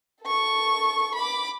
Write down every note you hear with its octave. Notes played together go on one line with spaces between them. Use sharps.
A4 C#6
B5 D6